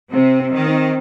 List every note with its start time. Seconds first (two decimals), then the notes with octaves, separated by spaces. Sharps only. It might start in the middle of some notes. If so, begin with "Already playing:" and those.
0.13 C3 C4
0.40 C4
0.53 D#3
0.66 C4